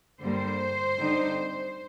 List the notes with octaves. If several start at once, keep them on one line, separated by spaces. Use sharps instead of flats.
G2 D3 G3 A#3 C5
D3 G3 C4 D#4